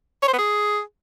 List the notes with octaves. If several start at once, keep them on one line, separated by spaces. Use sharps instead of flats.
C#5
C5
B3
G#4